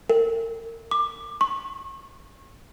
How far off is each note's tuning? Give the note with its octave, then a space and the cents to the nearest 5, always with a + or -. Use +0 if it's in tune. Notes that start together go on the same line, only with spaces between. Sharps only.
A#4 -35
D6 +20
C#6 -40